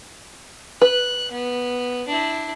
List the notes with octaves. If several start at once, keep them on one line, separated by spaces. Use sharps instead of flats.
B4 F#6
B3
D4 E4